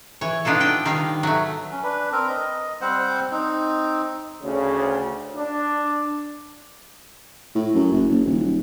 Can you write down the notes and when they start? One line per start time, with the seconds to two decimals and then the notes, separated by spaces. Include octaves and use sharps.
0.21 E3 C#5
0.45 B3 D4 D#4 F4 A4
0.60 D4 G5
0.85 D#3 G3 F5
1.23 F#3 A3
1.71 C#4
1.83 D4 B4
2.12 C4 A#4
2.29 D#5
2.81 G3 C4 C5 F#5
3.31 C4 D#4
4.43 D2 C#3
5.36 D4
7.55 A2
7.74 F#2
7.91 F#1
8.10 F#1
8.25 D#1